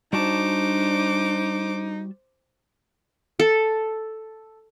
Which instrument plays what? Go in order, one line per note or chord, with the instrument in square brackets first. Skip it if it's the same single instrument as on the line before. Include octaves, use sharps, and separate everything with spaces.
[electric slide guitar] G3 F#4 A5 [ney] D4 [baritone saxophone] D#4 [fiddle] C5 D6
[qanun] A4